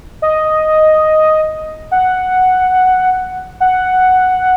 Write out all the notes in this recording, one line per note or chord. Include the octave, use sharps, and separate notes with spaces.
D#5
F#5
F#5